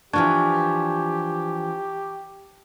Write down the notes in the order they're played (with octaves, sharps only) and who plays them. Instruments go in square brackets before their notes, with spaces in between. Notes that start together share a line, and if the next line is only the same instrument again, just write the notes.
[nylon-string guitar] E3 F3 D4 [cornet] G4 [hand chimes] A5 C#6 G#6